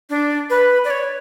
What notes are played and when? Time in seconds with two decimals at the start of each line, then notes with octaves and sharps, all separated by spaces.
0.10 D4
0.50 B4
0.85 D5
0.90 C#5